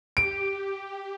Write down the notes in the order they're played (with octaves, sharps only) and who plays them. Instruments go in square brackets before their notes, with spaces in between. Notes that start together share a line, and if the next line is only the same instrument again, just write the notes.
[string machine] G4 [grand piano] D7